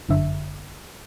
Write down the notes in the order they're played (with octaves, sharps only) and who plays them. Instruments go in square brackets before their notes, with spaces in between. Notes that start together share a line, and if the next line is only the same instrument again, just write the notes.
[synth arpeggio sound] G1 F#2 D3 E5